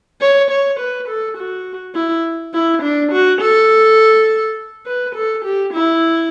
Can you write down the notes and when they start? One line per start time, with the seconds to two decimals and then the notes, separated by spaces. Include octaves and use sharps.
0.21 C#5
0.50 C#5
0.80 B4
1.08 A4
1.37 F#4
1.95 E4
2.54 E4
2.82 D4
3.12 F#4
3.41 A4
4.86 B4
5.15 A4
5.45 G4
5.73 E4